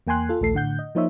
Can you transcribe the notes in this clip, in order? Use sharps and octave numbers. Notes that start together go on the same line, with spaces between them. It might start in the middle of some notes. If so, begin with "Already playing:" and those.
E2 A#3 G5 G#5 C6 F#6
F4 A4
A#1 D#2 A3 A4 C7
A2 D3 F#5 G6
D#5
F3 A#3 D#4 C5 C#5 E5